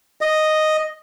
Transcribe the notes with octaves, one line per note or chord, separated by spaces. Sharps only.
D#5